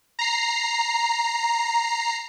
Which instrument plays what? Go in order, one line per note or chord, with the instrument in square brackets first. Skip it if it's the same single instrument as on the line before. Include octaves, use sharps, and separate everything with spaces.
[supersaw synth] A#5 C7